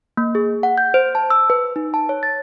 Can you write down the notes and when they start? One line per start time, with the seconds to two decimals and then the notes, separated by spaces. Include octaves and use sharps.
0.17 A#3
0.35 G#4
0.63 F#5
0.78 G6
0.94 C5
1.15 A5
1.30 E6
1.50 B4
1.76 D#4
1.94 A5
2.09 C#5
2.23 A6